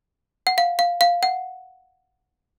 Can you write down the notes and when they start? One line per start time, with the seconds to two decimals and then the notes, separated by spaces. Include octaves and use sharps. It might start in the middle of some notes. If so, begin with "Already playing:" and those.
0.47 F#5
0.58 F5
0.79 F5
1.01 F5
1.23 F#5